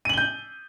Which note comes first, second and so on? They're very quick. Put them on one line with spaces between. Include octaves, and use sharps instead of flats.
D#7 F#7 G7 G6